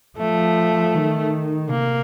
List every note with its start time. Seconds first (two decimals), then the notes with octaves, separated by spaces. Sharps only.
0.18 F3 A3
0.94 D#3
1.70 C3 A#3